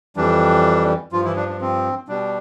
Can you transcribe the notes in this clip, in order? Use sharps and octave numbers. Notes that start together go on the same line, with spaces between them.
F2 E3 G3 D4
G2 F3 F4
E3 E4
D4
D4
C4
B2 G3 D4